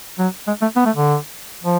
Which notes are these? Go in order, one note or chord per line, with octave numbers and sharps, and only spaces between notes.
F#3
G#3
A3
B3
A3
D3
F3